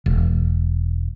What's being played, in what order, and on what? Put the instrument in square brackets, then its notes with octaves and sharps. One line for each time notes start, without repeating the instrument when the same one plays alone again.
[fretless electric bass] E1